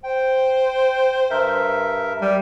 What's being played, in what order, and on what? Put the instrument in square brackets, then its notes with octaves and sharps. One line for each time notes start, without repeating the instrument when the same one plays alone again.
[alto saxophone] C5 [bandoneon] G5
[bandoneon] G2 A#4 E5
[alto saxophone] G3